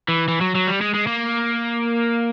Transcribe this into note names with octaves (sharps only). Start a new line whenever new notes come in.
E3
E3
F#3
F#3
G3
G#3
G#3
A#3